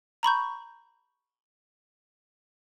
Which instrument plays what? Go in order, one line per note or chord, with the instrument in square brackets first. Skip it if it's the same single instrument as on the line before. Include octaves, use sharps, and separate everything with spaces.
[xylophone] A#5 B5 C#6 G6